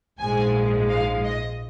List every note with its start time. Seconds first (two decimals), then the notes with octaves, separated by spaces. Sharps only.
0.19 A#1 G#2 F3 G#3 G#5
0.89 F5
1.24 D#5